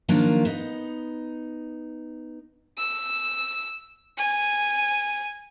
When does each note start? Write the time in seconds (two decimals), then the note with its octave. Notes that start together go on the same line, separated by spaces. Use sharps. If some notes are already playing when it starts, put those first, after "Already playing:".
0.09 D#3 F3 F#3 A#3 D4 F4
0.45 B3 D#4
2.78 E6
4.18 G#5